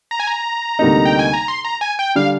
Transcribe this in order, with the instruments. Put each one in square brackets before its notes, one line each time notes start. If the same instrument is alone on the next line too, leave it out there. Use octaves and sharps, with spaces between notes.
[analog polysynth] A#5
G#5
A#5
[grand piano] D2 C3 G3 A#3 D#4
[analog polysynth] G5
G#5
A#5
C6
A#5
G#5
G5
[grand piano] D3 G3 D4 [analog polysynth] F5